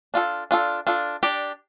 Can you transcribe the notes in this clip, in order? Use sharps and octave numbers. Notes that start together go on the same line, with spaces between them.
D4 F4 A4
D4 F4 A4
D4 F4 A4
D4 G4 D5